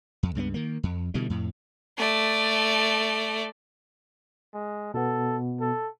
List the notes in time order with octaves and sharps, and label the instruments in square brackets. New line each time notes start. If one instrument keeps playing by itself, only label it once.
[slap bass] F2
C#2 G2 F3 B3
D#3 A#3
F2
B2 D3 E3 G3
F2 A2
[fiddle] A3 D5
[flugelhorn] G#3
[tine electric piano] B2 B3 [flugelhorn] A4
[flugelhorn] A4